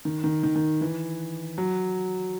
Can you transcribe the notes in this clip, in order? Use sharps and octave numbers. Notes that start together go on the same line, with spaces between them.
D#3
D#3
D#3
D#3
E3
F#3